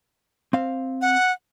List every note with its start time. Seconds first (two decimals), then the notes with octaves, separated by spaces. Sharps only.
0.53 C4 F5
1.01 F#5